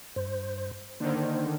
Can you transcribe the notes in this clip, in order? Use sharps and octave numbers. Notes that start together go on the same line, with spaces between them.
G2 C5
D3 D#3 A#3 C5